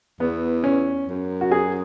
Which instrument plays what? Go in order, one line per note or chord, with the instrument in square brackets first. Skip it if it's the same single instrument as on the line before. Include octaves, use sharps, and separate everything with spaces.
[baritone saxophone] E2 [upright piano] B3
[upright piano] C#4
[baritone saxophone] F#2
[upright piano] F#4
G#4